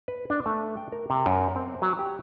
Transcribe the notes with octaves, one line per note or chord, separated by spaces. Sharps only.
B4
D4
A3
G5
A#4
C3
F#2
C4
F#3
G4